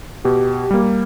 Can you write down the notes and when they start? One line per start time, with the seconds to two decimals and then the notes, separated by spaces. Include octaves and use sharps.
0.24 B2 G4
0.71 G3 A#3